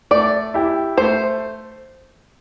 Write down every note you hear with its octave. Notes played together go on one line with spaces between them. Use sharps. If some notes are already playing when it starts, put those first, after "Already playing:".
A3 D5
E4 G4
A3 C5